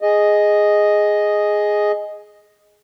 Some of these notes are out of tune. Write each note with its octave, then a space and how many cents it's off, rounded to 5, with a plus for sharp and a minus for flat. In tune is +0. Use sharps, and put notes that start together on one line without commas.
G#4 +0 D#5 +0